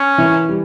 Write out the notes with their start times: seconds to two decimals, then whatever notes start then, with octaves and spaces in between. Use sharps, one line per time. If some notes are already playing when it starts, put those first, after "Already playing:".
Already playing: C#4
0.18 E3
0.49 G3